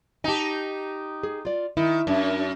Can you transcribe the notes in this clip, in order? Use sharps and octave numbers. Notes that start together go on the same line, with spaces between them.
D#4 G4 G#5 A5
G#4
F4 D5
D#3 E4
F#2 D4 E5 A5